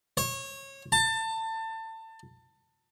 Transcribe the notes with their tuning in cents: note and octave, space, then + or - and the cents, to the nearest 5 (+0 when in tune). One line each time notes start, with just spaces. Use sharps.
C#5 -25
A5 +25